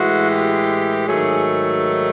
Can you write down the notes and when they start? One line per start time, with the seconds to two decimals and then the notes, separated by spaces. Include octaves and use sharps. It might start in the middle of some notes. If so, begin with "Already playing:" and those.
Already playing: A2 E3 G#3 F#4
0.30 G4
1.06 G#2 D#3 F#3 A3 G#4